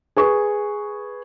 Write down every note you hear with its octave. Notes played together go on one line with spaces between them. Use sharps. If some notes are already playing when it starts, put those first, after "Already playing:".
G#4 B4 C#6